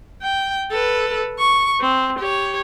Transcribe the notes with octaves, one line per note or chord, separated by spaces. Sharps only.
G5
A4 B4
C#6
C4
G4 C#5